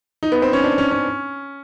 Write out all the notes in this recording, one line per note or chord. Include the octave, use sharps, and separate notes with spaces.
D#4
B3
C4
C#4
D4
C#4
C#4